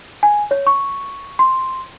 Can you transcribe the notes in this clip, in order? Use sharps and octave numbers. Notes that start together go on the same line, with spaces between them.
G#5
C#5
C#6
C6